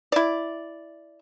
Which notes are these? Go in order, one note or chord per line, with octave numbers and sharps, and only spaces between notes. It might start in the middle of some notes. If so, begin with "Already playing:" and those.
E4 D5